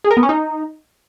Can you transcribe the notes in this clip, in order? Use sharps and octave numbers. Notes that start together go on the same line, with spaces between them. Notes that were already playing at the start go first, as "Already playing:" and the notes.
G#4
A#4
B3
C#4
D#4